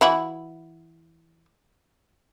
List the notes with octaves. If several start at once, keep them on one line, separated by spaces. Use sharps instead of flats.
E3 E4 F#4